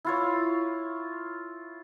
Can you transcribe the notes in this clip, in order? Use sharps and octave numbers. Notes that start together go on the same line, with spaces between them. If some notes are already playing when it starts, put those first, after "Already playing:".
E4 F4 C#5